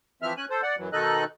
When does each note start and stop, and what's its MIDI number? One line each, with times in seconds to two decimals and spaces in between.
0.22 0.33 52
0.22 0.33 53
0.22 0.33 60
0.22 0.33 76
0.22 0.33 89
0.37 0.45 61
0.37 0.45 80
0.37 0.45 90
0.50 0.61 69
0.50 0.61 72
0.62 0.76 74
0.62 0.76 78
0.78 0.89 42
0.78 0.89 52
0.78 0.89 54
0.93 1.24 47
0.93 1.24 51
0.93 1.24 63
0.93 1.24 69
0.93 1.24 75
0.93 1.24 90